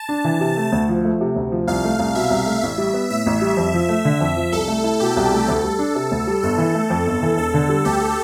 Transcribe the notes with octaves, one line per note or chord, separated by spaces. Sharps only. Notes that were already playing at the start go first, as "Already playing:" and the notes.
Already playing: A5
D4
E3
C3
A3
D2
F3
A3
C3
D2
F3
C2 F5
A3
C2
B2 E5
C2
A3
A1 E5
G3
B3
A2 E5
A1
G3
F2
F3
A3
D3
F2
F3
C2 A4
A3
E4
B2 G4
C2
A3
D2 A4
G3
D4
C3
D2
G3
G1 A4
E3
A3
F2
G1
E3
E1 A4
D3
G3
D2 G4